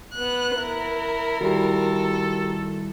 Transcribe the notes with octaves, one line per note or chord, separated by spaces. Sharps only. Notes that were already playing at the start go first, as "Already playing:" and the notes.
B3 F#6
E4 A#4
D#3 G3 E4 F#4 G4 A4